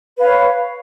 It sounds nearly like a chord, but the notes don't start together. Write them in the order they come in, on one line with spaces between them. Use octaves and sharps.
B4 F5 C#5